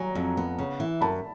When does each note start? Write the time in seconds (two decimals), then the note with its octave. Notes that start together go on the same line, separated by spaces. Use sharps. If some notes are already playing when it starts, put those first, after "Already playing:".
Already playing: F#3 G#5 A#5
0.15 F2
0.37 B3
0.58 C#3
0.80 E3
1.01 F#2 A5 B5